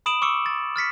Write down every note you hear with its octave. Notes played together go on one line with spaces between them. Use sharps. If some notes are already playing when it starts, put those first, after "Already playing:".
B5 D#6 D7 E7 F#7
C#6 D6 E6 C#7
A6
F6 A6 B6 C#7